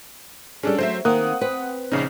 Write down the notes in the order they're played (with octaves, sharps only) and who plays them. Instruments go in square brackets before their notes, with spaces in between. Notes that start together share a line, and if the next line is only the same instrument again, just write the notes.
[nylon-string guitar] G3 G#4 [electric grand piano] C#4 D4 A4
[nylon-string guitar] F#3 G#3 A3 [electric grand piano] C5 E5
[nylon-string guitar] D#3 [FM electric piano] A#3 C4 [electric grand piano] F#5 D#6 F#6
[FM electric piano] C4 [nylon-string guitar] B4
[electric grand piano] A#1 C#3 D#4 [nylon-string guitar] C#4